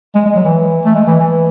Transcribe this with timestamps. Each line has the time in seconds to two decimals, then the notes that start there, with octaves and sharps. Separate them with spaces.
0.15 G#3
0.26 G#3
0.36 F#3
0.45 E3
0.85 A3
0.95 G#3
1.07 E3
1.21 E3